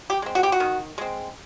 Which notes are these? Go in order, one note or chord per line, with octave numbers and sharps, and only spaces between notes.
G4
G#3 C4
F#4
G4
F#4
D#3
G#3 C4